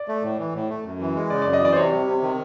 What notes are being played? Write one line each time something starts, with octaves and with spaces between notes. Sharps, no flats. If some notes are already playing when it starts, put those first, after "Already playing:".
Already playing: D5
A3
A2
E3
A2
A3
F#2
E3
G#3
C#3 D5
D5
F#2
D#5
E3 D5
C5
C3 C#5
G3
C3
D#3